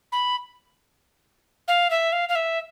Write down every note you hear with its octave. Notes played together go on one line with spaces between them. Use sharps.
B5
F5
E5
F5
F5
E5